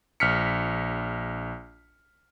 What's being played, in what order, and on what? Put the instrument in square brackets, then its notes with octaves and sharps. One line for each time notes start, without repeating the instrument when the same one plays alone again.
[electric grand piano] A#1 F6 B6 C#7